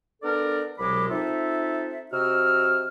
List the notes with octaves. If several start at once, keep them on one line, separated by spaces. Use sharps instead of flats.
B3 D4 A4 A#4 D5
C2 B2 F#3 G#3 B5 D6
C4 D#4 F4 A4 E5
C3 F#4 D#5 E6 F6